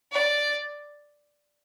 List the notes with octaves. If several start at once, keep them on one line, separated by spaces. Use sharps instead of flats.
D5